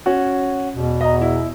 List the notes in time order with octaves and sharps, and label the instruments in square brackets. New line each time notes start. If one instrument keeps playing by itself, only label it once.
[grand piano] C#4 F#4
[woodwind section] E2 B2
[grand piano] D#5 A#5
E4